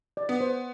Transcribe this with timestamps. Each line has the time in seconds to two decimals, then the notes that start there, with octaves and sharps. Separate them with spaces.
0.17 D5
0.29 B3
0.41 C5